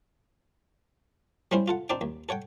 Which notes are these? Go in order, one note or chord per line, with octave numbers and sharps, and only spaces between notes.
G3 C4 C#4 E4 C5
F4 A4 F#5
C4 D4 D#4 D5 G5
D#2
A4 C#5 F#5 G5